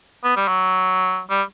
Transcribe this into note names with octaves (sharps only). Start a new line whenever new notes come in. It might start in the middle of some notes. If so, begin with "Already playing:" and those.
B3
G3
F#3
G3